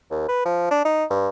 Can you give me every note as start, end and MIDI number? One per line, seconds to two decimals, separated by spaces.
0.11 0.27 39
0.28 0.45 71
0.45 0.66 53
0.71 0.84 62
0.85 1.05 63
1.10 1.29 43